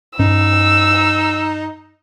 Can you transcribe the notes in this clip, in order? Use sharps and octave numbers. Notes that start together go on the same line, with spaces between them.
G2 C#4 D#4 E6